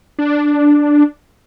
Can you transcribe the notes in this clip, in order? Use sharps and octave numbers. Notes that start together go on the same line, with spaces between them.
D4